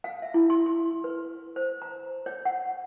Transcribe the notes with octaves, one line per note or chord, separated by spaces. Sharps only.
F5
E5
E4
C6
C6
B4
C5
A#5
C#5
F#5